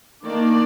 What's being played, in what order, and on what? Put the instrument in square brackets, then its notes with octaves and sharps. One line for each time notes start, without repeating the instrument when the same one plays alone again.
[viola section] D#3 A#3 D4 D5